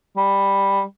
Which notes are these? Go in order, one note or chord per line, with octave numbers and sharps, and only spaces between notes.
G3